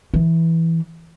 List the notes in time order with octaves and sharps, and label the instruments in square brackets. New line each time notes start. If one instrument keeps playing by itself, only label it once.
[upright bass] E3